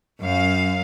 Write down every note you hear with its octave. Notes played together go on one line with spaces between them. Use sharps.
F#2 F5